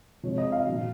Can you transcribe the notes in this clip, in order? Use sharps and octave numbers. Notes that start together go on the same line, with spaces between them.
C3 F3 G#3 C#5
D#5
F5
A#2 F3